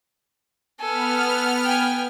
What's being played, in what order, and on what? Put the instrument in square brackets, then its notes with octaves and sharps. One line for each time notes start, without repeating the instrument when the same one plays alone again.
[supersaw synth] B3 F6 [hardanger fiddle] A4 G#5
[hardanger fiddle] G5 G#5